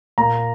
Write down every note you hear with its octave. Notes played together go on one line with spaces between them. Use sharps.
A#2 A#5